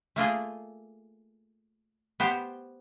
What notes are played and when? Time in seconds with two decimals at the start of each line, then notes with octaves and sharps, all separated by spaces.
0.16 A3 A#3 F4 G#4
2.20 B3 G4 C5